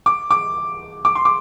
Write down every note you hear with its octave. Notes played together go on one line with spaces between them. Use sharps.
D6
D6
D6
C6
D6